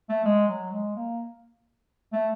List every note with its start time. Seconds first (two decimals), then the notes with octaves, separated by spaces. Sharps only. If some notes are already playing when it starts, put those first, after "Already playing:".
0.09 A3
0.25 G#3
0.48 F#3
0.72 G#3
0.96 A#3
2.13 A3